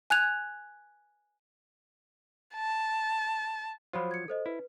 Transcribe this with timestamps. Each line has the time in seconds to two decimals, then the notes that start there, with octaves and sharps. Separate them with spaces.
0.10 G#5 F#6 G#6 F7
2.55 A5
3.93 F3 F#3 F4 C5 B5
4.11 G#6 C#7
4.28 A4 C5 D#5
4.46 E4 B4